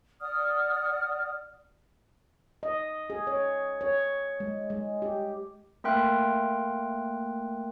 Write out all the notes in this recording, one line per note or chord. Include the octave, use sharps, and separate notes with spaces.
D5 F#5 D#6 F6
D#5
G#4
C#5
C#5
G#3
G#3
G4
A3 A#3 A#4 G5 C6 F#6